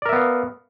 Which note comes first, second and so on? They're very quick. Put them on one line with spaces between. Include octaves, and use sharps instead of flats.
D5 A#4 E5 B3 F5